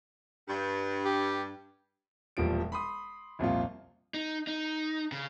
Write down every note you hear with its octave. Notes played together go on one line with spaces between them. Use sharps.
G2
G4
E1 A#2 F3 G3 D7
B5 C6 D#6
C2 F2 A#2 F4
D#4
D#4
C#3